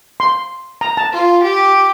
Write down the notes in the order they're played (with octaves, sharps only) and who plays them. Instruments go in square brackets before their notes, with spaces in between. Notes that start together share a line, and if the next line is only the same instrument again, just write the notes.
[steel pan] C6
A#5
A5
[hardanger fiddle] F4
G4